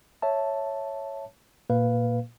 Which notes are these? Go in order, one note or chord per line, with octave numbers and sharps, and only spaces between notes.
C#5 E5 A5
A#2 A#3 B4 F5